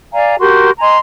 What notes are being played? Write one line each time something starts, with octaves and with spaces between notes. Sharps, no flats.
D5 F5 G#5 A#5
F#4 G4 A#4 C6
D#5 G#5 A#5 C6